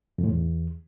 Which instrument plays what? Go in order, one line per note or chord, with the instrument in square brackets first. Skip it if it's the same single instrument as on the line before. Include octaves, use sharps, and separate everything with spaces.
[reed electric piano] F2
A2
E2